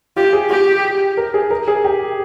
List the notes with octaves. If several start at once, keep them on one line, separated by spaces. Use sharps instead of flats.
F4 G4
G#4
G4
A#4
G#4
A#4
G#4
G4